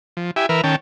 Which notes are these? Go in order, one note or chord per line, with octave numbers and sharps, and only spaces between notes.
F3
E4 G4 E5 G#5
E3 A#4 B4 E5 F6
D#3 C#4 G5 A5